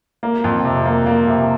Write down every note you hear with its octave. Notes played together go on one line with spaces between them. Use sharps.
A#3
F2
C3
A#3
A#3
C3